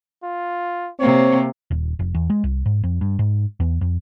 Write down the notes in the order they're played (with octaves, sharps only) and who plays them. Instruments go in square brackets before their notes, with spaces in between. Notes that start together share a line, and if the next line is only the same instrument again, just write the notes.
[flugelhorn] F4
[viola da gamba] C3 A#3 [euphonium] C4 [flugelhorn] C#5
[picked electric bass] D#1
F1
E2
G#3
C2
G#2
F2
G2
G#2
E2
F2